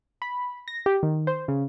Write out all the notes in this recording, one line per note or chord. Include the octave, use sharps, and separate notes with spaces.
B5
A#6
G4
D#3
C5
C#3